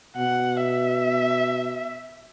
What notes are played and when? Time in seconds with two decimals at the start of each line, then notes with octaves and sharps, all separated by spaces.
0.17 B2 F#5
0.63 E5